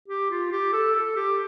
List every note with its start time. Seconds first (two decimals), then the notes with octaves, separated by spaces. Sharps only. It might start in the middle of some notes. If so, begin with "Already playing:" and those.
0.09 G4
0.31 F4
0.52 G4
0.73 A4
0.95 A4
1.16 G4